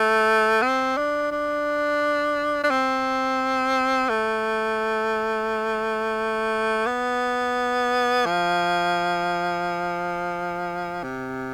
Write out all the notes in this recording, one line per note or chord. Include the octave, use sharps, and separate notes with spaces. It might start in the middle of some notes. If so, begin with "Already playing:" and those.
Already playing: A3
C4
D4
D4
D4
C4
A3
B3
F3
C3